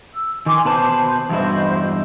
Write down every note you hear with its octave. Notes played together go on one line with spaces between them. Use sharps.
E6
D#3 G#5 C6 D6
B2 B4 C5 A5
E2 G2 E4 F#4 C5 D#5